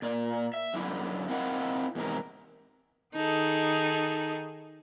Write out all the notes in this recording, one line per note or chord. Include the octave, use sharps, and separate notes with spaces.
A#2 D5
E5
F#2 D3 E4
C4 E4 A#4 D#5 F5 F#5
E2 G#2 C3 A#4
D#3 D#4 G#4 A4